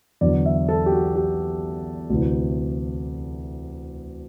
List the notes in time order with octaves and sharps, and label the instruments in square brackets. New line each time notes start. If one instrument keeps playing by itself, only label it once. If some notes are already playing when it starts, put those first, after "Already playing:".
[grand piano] E2 D3 F#3 D5
E5
A4
G4
F#4
G4
D2 C3 E3